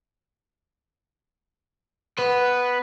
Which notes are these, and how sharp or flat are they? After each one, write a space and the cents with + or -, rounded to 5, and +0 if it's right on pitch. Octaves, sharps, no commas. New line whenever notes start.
B3 +0 B4 +0